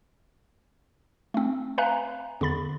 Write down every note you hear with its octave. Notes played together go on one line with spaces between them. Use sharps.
A3 C4
B4 E5 F5 G#5 A#5 F#6
E2 D3 B5 A6